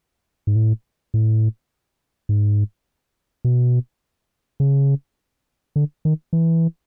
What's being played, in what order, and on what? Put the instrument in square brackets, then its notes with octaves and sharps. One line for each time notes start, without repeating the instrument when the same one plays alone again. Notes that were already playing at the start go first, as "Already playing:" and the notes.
[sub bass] G#2
A2
A2
G#2
B2
C#3
D3
D#3
E3